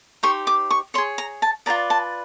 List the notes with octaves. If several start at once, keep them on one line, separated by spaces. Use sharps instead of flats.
D#4 G4 C5 C#6
D6
C#6
G#4 C#5 C6
A#5
A5
F4 G#4 B4 D5 A#5
A5